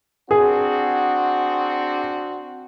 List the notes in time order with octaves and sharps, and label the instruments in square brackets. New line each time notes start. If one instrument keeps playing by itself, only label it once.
[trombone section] C4 D4 F#4 [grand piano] G#4